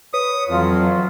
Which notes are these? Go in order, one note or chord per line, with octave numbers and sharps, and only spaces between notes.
B4 C#5 D#6
F2 E3 F#3 F4